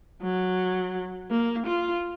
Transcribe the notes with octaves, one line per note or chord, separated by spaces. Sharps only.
F#3
A#3
F4